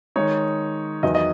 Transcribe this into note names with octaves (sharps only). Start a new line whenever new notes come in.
D#3 G#3 D#4 C#5
E2 D#3 F#3 D#5
D#5